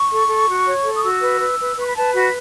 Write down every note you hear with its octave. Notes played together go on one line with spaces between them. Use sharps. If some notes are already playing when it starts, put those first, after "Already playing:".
Already playing: C#6
A4
A4
F#4
C#5
A4
D#6
F#4 E6
B4
B4
B4
B4 C#6
B5
B4 A5
F#4 B5